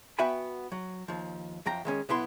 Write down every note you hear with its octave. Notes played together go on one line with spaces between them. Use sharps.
B3 F#4 E5 G5 G#5 B5
F#3
D#2 F3
F#2 F3 G5 A#5
D#3 G#3 C#4
B1 B3 E4 C6